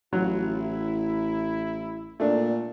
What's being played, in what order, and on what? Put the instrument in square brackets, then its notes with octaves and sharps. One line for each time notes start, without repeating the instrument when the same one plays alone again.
[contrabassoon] A1 [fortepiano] F#3 [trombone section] E4 F4
[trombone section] E4
[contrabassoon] A#2 [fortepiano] A3 D4